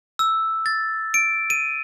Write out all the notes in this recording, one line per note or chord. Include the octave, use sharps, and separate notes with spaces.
E6
A6
D7
D#7